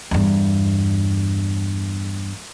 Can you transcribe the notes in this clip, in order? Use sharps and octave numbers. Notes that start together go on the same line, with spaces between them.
E2 G2